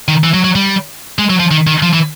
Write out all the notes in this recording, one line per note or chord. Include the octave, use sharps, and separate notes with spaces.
D#3
E3
F#3
F#3
G3
G#3
F#3
F3
D#3
D#3
F3
E3